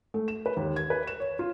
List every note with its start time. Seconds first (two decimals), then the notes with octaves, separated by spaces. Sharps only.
0.14 A3
0.28 E7
0.46 B4
0.57 D#2
0.76 G#6
0.90 B4
1.07 E7
1.20 C#5
1.39 F4